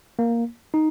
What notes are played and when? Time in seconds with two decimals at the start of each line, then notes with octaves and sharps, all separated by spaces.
0.19 A#3
0.74 D#4